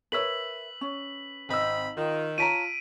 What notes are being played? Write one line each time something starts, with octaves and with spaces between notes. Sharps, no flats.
A#4 B4 C#5 E5 E6 B6 F#7
C#4
G#1 C4 D#4 D#5 B5 E6
D#3 F4
F4 C#5 A5 A#5 B6 D7 D#7